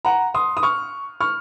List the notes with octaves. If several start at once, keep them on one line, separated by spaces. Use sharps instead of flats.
F#5 A#5
C6 D#6
D#6
C#6 F6
C#6 F6